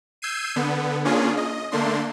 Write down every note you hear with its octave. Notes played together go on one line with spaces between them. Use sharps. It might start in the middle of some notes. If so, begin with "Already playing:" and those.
E6 G6 G#6 C7 D#7
D3 B3
A#3 C#4 D4 F4 G#4
D#5
D3 A3 A#3 D4 C6